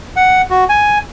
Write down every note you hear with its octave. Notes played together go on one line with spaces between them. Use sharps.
F#5
F#4
G#5